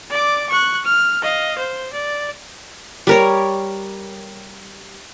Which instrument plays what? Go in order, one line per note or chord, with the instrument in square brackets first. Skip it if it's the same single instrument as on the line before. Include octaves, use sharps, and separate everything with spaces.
[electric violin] D5 D6
C#6 F#6
F6
D#5 F5
C5
D5
[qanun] G3 A#4 C#5